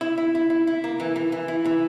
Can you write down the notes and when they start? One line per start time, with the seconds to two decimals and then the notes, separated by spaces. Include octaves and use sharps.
0.01 E4
0.18 E4
0.35 E4
0.50 E4
0.67 E4
0.84 A#3
1.00 E3
1.16 E3
1.32 E3
1.48 E4
1.65 E3